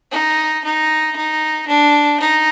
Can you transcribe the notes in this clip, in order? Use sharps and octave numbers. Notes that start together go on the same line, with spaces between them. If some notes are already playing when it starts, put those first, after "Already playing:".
D#4
D#4
D#4
D4
D#4